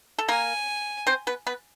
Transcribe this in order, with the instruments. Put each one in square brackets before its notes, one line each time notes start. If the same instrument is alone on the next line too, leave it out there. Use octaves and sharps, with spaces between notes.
[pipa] A4
[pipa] A#3 A#4 [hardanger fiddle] G#5
[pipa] C4 C5
B3 B4
B3 B4